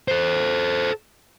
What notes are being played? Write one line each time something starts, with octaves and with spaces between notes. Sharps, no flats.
A4 C5